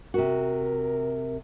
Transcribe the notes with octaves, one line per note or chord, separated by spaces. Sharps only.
C3 F#4 A#4